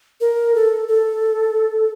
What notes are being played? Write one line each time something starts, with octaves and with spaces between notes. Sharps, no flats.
A#4
A4
A4